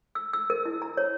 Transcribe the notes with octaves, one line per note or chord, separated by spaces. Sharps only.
E6
E6
A#4
E4
A#5
C#5